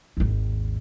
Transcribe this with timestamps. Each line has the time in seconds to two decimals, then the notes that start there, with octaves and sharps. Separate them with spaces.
0.17 G#1 D#2